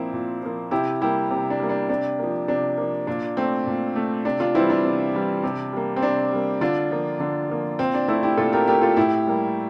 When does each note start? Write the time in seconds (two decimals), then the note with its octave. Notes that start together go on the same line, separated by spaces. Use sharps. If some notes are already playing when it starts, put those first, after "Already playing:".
Already playing: A#2 F3 A#3 C4 E4
0.13 A#2
0.42 F3 A#3
0.71 C3 E4 G4
1.01 G3 A#3 E4 G4
1.30 C3
1.50 D4
1.60 G3 A#3
1.69 D4
1.89 C3 D4
2.19 F3 A#3
2.48 C3 D4
2.77 F3 A#3
3.07 A#2 D4
3.37 A3 C4
3.67 A#2
3.96 A3
4.25 C3 D4
4.40 D4 F4
4.54 E3 G3 C4 E4
4.70 D4
4.85 C3
5.13 E3 G3
5.43 C3
5.73 G3 A#3
5.96 C4
6.02 C3 D4
6.32 G3 A#3
6.61 D3 D4 F4
6.91 F3 A#3
7.20 D3 D4
7.50 F3 A#3
7.79 A#2 C4
7.94 D4
8.08 A3 C4 E4
8.23 E4 G4
8.37 A#2 F4 A4
8.53 G4 A#4
8.67 A3 G4 A#4
8.82 F4 A4
8.96 A2 E4 G4
9.27 G3 A#3